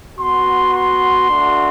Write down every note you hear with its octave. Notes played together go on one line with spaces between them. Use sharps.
B3 F#4 C6
C6
A3 D4 F#4